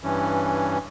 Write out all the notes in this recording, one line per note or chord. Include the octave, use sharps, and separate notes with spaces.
G2 E3 C#4